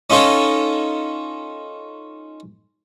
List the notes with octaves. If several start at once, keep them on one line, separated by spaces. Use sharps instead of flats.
C#4 D#4 F4 A4 C#5